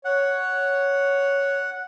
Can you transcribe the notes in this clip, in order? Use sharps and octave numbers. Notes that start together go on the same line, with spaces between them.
C#5 F#5